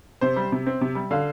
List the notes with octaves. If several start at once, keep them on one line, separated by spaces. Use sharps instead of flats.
C3 C5
G3
C3
C4
C3
G3
D3 F5